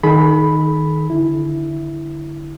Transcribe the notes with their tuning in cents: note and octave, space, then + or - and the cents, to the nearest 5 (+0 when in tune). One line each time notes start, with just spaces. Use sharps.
D#3 +0 G#4 +45 B5 +0
D3 +0 E4 +0